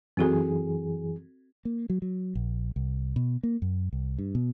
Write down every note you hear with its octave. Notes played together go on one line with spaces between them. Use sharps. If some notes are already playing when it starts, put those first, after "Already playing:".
F#2 E3 C4 F#4 G#4 A4
A#3
F#3
F#3
A#1
C2
B2
A#3
F#2
C2
G2
B2